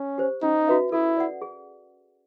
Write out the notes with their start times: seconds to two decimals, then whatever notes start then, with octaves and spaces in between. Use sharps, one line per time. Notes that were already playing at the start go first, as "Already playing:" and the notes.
Already playing: C#4
0.18 G4 C5
0.42 C#4 D#4
0.68 F#4 B4 E5
0.92 E4 A4
1.17 D5 F#5
1.42 G#4